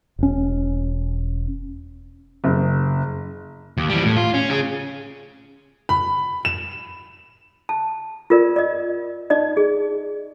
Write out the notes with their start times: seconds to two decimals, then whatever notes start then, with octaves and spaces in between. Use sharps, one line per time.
0.19 E1 C#4
2.44 F#1
3.77 D#2
3.89 E3 G3
4.04 A2
4.16 F4
4.34 C#4
4.50 C#4 G#4
5.89 B5
6.45 E7
7.69 A5
8.30 F4 A#4 D5
8.56 D5 D#5
9.30 D#4 D5 D#5
9.57 G#4